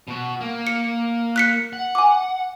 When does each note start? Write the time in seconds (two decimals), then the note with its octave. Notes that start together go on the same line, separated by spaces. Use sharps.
0.08 B2 F#4
0.41 A#3
0.67 C#7
1.36 F#6 B6 C#7
1.73 F#5
1.95 G#5 D6